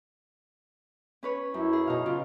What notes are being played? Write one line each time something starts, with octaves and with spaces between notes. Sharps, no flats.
C#4 B4 C#5
F#2 E4
G#4
B2 D#4 F5
C#3 F4